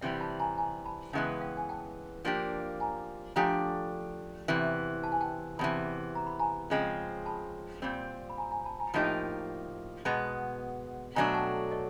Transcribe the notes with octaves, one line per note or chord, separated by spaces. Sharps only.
C3 E3 G3 E5 F#5
A5 B5
G#5 A#5
G#5 A#5
A5 B5
C#3 E3 G#3 B3 G5 A5
F5 G5
G#5
G5 A5
F3 A#3 D4 G4
G#5 A#5
F3 A3 D4 G4 G#5 A#5
E2 C3 E3
A5
G#5
G5 A5
E2 C3 E3 A5 B5
A#5
B5
G#5 A#5
C#3 F3 G#3 C4
A5 B5
A#2 G3 C4
B5
G#5 A#5
G#5 A#5
A5 B5
G#5 A#5
A2 F3 A#3 D#4 G4 A5 B5
B2 G#3 B3 A5 B5
B2 F#3 A3 D4 G#5 A#5
G5 A5
C#5 D#5